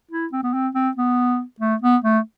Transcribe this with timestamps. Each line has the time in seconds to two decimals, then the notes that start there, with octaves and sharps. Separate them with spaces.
0.11 E4
0.32 C4
0.43 B3
0.53 C4
0.75 C4
0.97 B3
1.60 A3
1.82 B3
2.04 A3